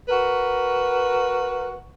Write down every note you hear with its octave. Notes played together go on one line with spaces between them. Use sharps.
F#4 A#4 B4